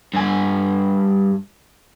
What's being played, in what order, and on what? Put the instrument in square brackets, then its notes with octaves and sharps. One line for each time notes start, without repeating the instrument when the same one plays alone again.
[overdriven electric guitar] G2 G#5